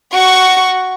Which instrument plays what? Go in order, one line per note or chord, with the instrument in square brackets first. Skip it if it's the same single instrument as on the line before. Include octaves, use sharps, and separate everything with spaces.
[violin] F#4 C#6